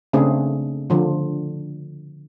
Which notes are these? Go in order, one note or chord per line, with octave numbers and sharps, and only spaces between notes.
C#3 A3 C4 D4 G#4
D3 F3